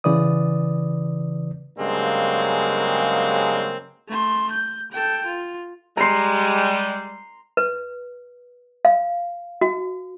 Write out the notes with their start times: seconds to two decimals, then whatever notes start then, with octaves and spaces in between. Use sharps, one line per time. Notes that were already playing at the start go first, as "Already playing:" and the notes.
0.04 C#3 E3 B4 D5 D#6
1.78 G2 C#3 F#3 G#3 A#3 C4
4.08 A3 C6
4.51 G6
4.91 A4 G5
5.26 F4
5.97 G3 G#3 A#5 C6
7.57 B4
8.85 F5
9.61 F#4